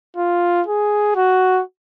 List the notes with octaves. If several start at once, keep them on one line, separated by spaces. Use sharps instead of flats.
F4
G#4
F#4